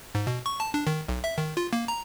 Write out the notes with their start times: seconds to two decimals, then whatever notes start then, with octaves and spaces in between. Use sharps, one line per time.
0.15 G#2
0.27 B2
0.46 C#6
0.60 A5
0.74 D4
0.87 D#3
1.08 B1
1.24 E5
1.38 D#3
1.57 F4
1.73 A#3
1.88 A#5